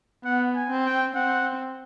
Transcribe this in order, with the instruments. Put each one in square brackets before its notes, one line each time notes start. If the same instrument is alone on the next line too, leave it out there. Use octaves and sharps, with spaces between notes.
[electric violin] B3 [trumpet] F#5
[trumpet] G#5
[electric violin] C4
[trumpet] G5
[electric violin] C4 [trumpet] F#5